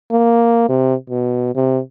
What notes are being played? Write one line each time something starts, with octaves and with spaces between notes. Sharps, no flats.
A#3
C3
B2
C3